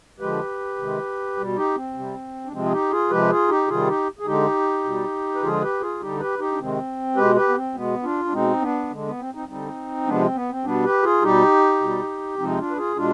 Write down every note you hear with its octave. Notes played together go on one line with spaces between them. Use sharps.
D3 F3 G#3 G4 B4
C3 D#3 G#3
B2 G3
D#4 G4
C4
C3 G3
D4
C3 F3 G#3 C4
G#4
D#4 G4
F4 G#4
C3 F3 G#3 G4 B4
F4 G#4
D#4 G4
C3 D#3 G3 F4 G#4
D#4 G4
G#4
D3 G#3 D#4 G4
B2 G3
B4
D3 F3 G#3 F4 G#4
G4 B4
F4 G#4
D3 G3 D#4 G4
G4 B4
D#4 G4
D4
C3 D#3 G#3 C4
B2 G#3 G4 B4
G4 B4
B3
C4
B2 G#3 B3
D4 F4
D4
B2 G#3 C4 D#4
B3 D4
D3 G#3
B3
C4
C4 D#4
D3 G3 C4 D#4
C3 F3 G#3 B3 D4
C4
B3
C4
B2 G3 B3 D4
G4 B4
F4 G#4
B2 G3 D#4 G4
B2 G3
C3 F3 G#3 C4 D#4
D4 F4
B4
F4 G#4
B2 G#3 D4 F4